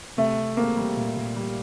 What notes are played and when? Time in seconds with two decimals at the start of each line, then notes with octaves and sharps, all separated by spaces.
0.17 C3 A3
0.38 C3
0.57 A#3 C4
0.77 G3
0.96 A#2
1.16 A#2
1.36 G3